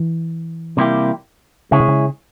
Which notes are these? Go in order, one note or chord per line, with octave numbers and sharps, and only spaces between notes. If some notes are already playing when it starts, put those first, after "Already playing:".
Already playing: E3
C3 G3 A#3 E4 G4
C#3 G#3 E4 G#4 C#5
C3
C#3